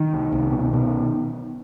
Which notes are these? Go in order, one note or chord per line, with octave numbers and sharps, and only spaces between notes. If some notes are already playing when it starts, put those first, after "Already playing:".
Already playing: D#3
C2
C2
B2
B2